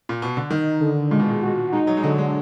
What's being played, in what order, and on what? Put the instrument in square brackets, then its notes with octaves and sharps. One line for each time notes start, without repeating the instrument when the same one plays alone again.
[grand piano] A#2
B2
D3
[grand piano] D#3 [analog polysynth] D#4
[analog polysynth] D3
[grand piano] A#2 [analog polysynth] G#3
[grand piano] B2
A#2
[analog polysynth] F#4
[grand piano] G#3 [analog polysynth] D#4
[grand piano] F#3
G#3
[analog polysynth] D3 [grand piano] F#3
[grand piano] G#3